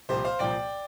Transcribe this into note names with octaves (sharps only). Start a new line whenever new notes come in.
C2 A#2 F3 G4 C5
C5 F5
C2 A#2 F3 D5 G5